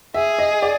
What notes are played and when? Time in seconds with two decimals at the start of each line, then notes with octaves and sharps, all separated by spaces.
0.14 G#4 E5
0.39 D#5
0.62 D5